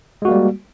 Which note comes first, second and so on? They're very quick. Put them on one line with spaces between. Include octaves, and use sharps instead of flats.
G#3 F#4 A#3 G3